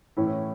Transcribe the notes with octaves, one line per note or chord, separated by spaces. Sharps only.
A2 E3 C#4 E4
C#4 E4